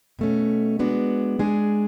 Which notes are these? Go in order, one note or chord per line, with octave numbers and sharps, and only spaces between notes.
B2 A3 C#4
G#3 B3 D4 F#4
G#3 D4 G#4